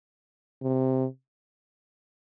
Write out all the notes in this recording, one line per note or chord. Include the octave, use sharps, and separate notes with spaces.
C3